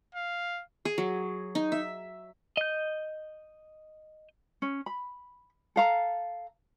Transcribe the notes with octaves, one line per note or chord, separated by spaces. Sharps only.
F5
G#4
F#3
D#4
E5
D#5 G6
C#4
B5
A4 F5 A#5